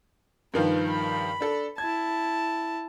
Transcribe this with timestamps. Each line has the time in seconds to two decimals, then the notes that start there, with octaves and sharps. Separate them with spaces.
0.54 G2 D#3 F3 B4
0.90 B5
1.41 D4 A4
1.78 E4 A5 G#6